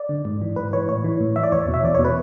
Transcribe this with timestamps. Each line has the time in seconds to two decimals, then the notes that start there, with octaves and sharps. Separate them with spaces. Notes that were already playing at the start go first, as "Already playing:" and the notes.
Already playing: D5
0.09 D3
0.25 G#2
0.42 E3
0.56 G#2 B4
0.73 E3 C#5
0.89 A2 C#5
1.04 E3
1.21 A2
1.36 E3 E5
1.43 D5
1.52 E2 C#5
1.68 B2
1.74 E5
1.83 E2 D5
1.95 B2 C#5
2.05 B4